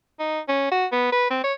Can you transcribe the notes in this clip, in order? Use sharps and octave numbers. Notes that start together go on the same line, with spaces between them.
D#4
C#4
F#4
B3
B4
C4
C#5